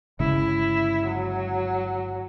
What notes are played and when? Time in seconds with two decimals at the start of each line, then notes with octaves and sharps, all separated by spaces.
0.20 G1 C#3 G#3 E4
1.07 F#3